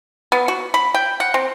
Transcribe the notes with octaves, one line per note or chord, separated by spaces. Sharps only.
B3
F#4
B5
G5
F#5
C4